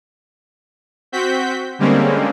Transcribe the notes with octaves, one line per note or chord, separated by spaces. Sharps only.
C4 F#4 G6 B6
D3 G3 G#3 A#3 C4 C#4